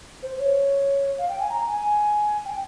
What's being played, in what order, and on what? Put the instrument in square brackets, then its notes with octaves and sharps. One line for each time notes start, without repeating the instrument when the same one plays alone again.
[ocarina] C5
C#5
F5
G5
G#5
A#5
G#5
G5